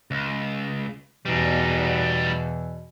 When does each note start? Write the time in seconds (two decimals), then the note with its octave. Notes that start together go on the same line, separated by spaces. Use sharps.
0.11 C#2
1.25 E2 B2 E3 G3 D#4